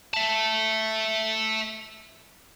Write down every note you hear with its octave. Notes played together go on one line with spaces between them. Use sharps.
E5 A5